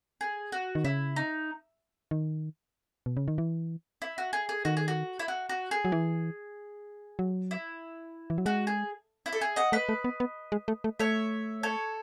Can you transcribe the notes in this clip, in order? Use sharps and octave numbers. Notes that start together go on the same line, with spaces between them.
G#4
F#4
D#3
C#3 E4
D#4
D#3
B2
C#3
D#3
E3
E4
F#4
G#4
G#4
D#3 F#4
G#4
F#4
E4
F#4
F#4
G#4
F#3
E3
F#3
E4
E3
F#3
G#3 F#4
G#4
E4
A4
G#4
D#5 F#5
A3 B4 D#5
A3
B3
B3
G#3
A3
A3
A3 C#5 E5
A4 C#5